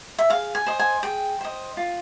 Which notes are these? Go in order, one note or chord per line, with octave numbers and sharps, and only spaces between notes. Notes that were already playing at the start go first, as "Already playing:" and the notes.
E5
G#4 F5
G#5
C5 D#5
G#5
G#4 G5
C5 D#5
F4